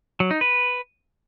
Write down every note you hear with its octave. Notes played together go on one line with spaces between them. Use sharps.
F#3
D#4
B4